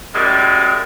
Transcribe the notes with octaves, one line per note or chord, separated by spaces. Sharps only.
F#2 A2 G3 G#3